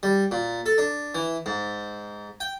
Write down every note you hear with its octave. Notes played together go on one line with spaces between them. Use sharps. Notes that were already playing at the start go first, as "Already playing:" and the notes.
G3
A#2
A4
D4
E3
G#2
G5